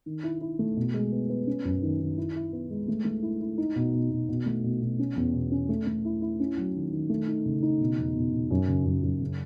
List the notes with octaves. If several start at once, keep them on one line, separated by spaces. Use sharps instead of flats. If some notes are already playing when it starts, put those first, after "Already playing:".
D#3
E4
E4
A3
B2
G#3
B3
B3
C#4
F#2
D#3
D#3
E4
E4
B3
G#3
A3
A3
E4
E4
D#4
B2
B2
B2
B2
A3
B2
B2
C#4
E2
B2
C#4
A3
A3
E4
E4
C#4
F#3
D#3
D#3
A3
D#4
C#3
D#4
B2
E2
B2
B2
F#2
C#3
F#2
F#2
C#3